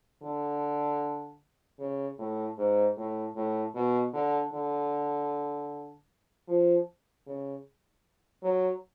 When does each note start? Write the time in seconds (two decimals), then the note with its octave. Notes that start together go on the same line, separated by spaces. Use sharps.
0.23 D3
1.80 C#3
2.19 A2
2.59 G#2
2.98 A2
3.36 A2
3.75 B2
4.14 D3
4.54 D3
6.49 F3
7.27 C#3
8.43 F#3